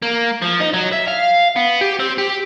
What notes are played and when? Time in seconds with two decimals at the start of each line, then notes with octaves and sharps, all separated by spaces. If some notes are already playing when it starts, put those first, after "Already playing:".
0.02 A#3
0.42 F3
0.60 D#4
0.74 F#3
0.92 E5
1.08 F5
1.56 B3
1.81 G4
1.99 C4
2.18 G4